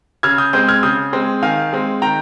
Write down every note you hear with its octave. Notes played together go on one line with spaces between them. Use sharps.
C#3 F6 G#6
D#6 G6
G#3 C4 D#6 G6
F6 G#6
C#3 D#6 G6
G#3 C4
D#3 F5 G#5
G#3 C4
D#3 G5 A#5